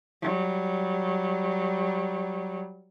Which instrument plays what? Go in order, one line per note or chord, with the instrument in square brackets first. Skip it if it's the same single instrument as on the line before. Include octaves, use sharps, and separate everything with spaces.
[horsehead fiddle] F#3 G3